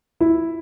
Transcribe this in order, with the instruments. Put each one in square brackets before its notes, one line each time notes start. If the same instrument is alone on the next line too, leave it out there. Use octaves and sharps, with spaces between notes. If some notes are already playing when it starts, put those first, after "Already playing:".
[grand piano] E4